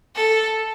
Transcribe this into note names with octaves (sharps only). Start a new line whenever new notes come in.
A4